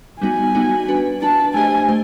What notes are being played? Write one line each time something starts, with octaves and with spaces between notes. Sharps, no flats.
G3 B3 D#4 F#4 G#5
G3 B3 D#4 F#4
D4 F#4 B4
D4 F#4 B4 A5
A3 D4 G4 C5 D#5 G#5
A3 G4 C5